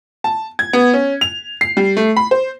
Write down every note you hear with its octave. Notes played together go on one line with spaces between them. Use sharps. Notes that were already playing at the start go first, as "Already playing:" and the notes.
A5
G#6
B3
C#4
F7
C7
G3
A3
B5
C5